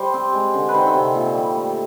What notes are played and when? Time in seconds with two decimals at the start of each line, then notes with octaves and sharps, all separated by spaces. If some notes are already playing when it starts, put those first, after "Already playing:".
Already playing: G3 C5
0.14 C4
0.33 G#3
0.54 D3
0.69 B4
0.74 D#3 C5
0.87 E5
0.94 C3
1.15 A#2
1.34 G3
1.54 A3